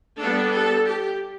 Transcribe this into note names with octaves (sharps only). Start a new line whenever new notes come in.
G3 B3 D4 A4
A4
G4